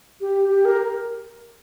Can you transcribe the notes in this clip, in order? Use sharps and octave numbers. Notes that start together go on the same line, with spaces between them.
G4
G4
A#4